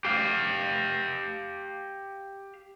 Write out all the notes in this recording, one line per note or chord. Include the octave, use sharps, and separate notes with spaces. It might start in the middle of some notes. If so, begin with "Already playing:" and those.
G4 F5